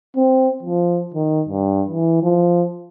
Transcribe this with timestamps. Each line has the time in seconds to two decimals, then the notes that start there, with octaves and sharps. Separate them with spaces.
0.17 C4
0.63 F3
1.14 D#3
1.49 G2
1.88 E3
2.23 F3